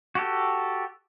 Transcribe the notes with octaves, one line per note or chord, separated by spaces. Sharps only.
F#4 G4 A4